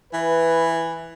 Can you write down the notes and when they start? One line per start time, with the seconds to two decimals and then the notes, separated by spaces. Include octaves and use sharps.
0.13 E3 B4